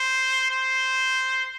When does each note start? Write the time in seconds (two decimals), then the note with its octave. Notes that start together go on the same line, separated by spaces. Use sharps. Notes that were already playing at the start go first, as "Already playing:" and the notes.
Already playing: C5
0.51 C5